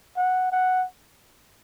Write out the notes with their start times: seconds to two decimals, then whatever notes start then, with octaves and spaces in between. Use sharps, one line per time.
0.17 F#5
0.52 F#5